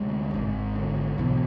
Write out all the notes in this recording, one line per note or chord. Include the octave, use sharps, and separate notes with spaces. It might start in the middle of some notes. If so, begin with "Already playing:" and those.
Already playing: D2 C3 G#3
G#1 G#2
D3
B1 B2 E3